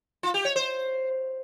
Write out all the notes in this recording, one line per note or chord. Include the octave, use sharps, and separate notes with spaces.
F4
G4
C#5
C5